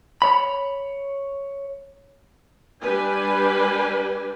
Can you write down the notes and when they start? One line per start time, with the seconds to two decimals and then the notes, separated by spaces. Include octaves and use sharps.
0.22 C#5 B5
2.81 G3 D4 G4 B4 G#5